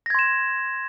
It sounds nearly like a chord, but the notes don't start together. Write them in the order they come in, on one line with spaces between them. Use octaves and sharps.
A#6 G#6 C6 E7